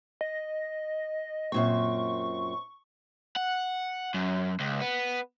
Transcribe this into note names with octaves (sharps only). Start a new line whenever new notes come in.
D#5
F#2 A#2 C4 C#6
F#5
F#2
C#2
B3